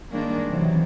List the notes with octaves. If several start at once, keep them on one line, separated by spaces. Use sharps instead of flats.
G2 D#3 G#3 A#3 D4
C3 D#3 E3 F#3